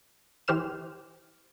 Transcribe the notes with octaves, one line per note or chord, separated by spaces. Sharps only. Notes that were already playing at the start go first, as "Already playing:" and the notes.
E3 G4 C5 F6 E7